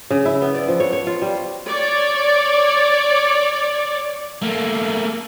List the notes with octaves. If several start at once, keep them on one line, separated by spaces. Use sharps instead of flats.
C#3
E4
B3
D5
F3
C#5
C#5
F4
G3
C#5 D5
A3 A#3